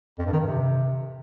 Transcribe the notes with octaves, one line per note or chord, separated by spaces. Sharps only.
F2
G2
D#3
G2
C3